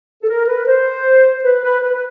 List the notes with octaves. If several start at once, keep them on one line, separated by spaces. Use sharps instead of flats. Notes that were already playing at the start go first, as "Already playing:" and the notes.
A4
A#4
B4
C5
B4
B4
B4
B4